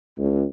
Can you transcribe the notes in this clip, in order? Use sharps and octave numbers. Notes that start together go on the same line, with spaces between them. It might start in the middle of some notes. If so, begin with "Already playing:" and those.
C#2